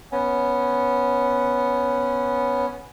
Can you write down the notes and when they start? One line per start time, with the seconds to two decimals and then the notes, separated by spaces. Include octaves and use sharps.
0.12 B3 C#4